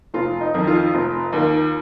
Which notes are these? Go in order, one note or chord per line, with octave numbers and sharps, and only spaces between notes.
F1 F4
D#4
F2 D#3
F4
F1
D#2 D#3